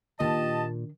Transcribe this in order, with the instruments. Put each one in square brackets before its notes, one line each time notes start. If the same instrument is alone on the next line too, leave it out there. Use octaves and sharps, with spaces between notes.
[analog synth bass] A#2 [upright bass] D#3 D4 [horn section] G4 D#5 A5